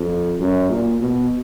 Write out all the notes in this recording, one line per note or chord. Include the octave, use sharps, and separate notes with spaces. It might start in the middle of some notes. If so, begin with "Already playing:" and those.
Already playing: F2
F#2
A#2
B2